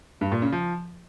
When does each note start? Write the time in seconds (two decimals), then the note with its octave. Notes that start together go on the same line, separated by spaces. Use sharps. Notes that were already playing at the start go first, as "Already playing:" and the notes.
0.21 G2
0.32 A#2
0.42 C#3
0.52 F3